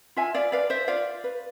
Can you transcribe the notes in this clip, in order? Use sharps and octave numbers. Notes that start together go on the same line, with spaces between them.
F4 E5 G#5
D5 F5
B4 D5 F5
C5 E5
F4 D5 F5
B4